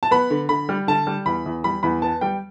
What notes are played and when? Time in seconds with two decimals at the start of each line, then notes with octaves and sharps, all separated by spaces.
0.03 A5
0.11 B3 B5
0.30 D3
0.49 D3 B5
0.69 G3
0.87 D3 A5
1.07 G3
1.26 E2 B5
1.46 E2
1.64 G3 B5
1.83 E2 B5
2.02 B3 A5
2.21 G3 G5